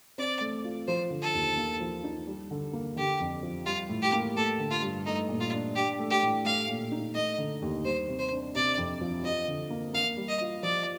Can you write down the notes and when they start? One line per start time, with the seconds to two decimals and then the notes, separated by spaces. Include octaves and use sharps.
0.18 C4 D5
0.41 A3
0.64 F4
0.88 F3 C5
1.10 D3
1.22 A4
1.34 D#2
1.57 A#3
1.80 F3
2.04 D#4
2.27 G3
2.51 D3
2.73 A#3
2.96 D3 G4
3.20 F2
3.43 F3
3.66 G3 F4
3.89 A2
4.02 G4
4.13 A#3
4.36 A3 A4
4.59 D3
4.70 F4
4.82 G2
5.06 A3 D#4
5.29 A#2
5.40 F4
5.53 D4
5.75 D4 G4
5.99 A3
6.10 G4
6.22 A2
6.45 A3 F5
6.68 A#2
6.92 D#4
7.15 A3 D#5
7.38 D3
7.62 D#2
7.85 G3 C5
8.08 C3
8.19 C5
8.31 D4
8.55 C3 D5
8.78 F2
9.01 F3
9.24 F3 D#5
9.48 D3
9.70 A#3
9.93 A#3 F5
10.17 G3
10.29 D#5
10.41 F4
10.63 F3 D5